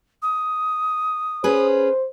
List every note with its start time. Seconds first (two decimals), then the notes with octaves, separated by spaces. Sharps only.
0.22 D#6
1.44 C#4 G#4 B4 C5